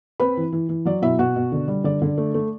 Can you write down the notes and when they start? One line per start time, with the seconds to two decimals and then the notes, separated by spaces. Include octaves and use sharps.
0.20 C4 B4 B5
0.37 E3
0.52 E3
0.69 E3
0.85 F#3 D5
1.02 B2 E4 E5
1.19 B2 F#4 F#5
1.36 B2
1.52 D3
1.68 G3
1.84 D3 D5
2.02 D3
2.18 A3
2.34 A3